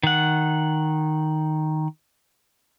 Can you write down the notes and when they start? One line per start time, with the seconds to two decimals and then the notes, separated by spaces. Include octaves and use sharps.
0.03 D#3 F#5